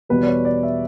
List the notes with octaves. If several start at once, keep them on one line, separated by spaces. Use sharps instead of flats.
E2 B2 G3 B4
D5
C#5
D5
E5